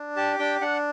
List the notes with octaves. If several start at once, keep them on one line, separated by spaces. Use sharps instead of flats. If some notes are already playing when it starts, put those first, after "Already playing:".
Already playing: D4
G4 A5
D4 G5
D4 F#5